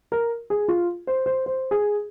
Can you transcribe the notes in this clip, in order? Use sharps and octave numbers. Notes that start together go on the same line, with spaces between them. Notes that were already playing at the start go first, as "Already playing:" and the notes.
A#4
G#4
F4
C5
C5
C5
G#4